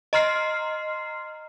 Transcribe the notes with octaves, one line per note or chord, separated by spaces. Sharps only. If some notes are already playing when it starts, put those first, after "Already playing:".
D#5 A#5 C6 F6 C7